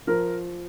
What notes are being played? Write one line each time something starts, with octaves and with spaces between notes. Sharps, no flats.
F3 A#4